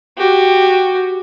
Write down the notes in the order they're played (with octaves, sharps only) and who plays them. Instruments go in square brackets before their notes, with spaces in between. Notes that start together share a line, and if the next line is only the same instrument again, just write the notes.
[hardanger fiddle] F#4 G4